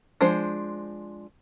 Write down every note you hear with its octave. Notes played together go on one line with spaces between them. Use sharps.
F3 G#3 D4 C5